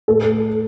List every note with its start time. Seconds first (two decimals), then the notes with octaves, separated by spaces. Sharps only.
0.08 A2 A4